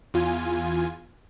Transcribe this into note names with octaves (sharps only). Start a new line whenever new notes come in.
E2 F4 G#5